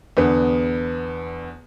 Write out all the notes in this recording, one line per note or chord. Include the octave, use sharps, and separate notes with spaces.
E2 D3 B3